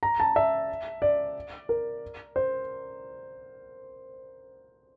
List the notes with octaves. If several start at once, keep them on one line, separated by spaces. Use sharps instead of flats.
A#5
A5
E5
D5
A#4
C5